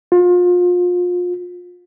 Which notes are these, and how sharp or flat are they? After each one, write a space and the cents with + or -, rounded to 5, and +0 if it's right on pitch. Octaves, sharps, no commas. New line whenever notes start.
F4 +30